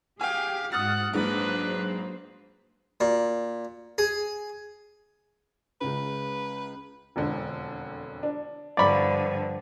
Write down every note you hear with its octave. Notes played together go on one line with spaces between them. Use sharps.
G4 G#4 F5 G5 G#5
G#2 F#4 F#5 D#6 F6 A6
A#1 G#2 F#3 A#3 D4 B4 C5
A#2
G#4
C#2 C#3 B4
E1 F2 D3
D4
G2 D3 F3 D5 B5 C#6 F6